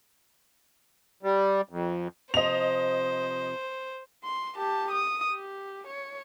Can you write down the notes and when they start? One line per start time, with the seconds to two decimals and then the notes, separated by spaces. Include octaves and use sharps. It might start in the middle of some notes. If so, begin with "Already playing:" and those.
1.23 G3
1.69 F2
2.34 C3 F3 C5 D#5 F7
4.24 C6
4.56 G4 A5
4.91 D#6
5.31 G4
5.87 C#5